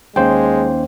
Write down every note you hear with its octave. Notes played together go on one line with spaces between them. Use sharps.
D#2 G#3 C#4 C5 G5